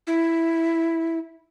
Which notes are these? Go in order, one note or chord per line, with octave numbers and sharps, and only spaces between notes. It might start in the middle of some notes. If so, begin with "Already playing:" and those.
E4